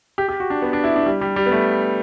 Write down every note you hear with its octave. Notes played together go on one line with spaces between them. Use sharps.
G4
G4
F#4
D4
B3
D4
E4
D4
G3
G3
G3
B3
A3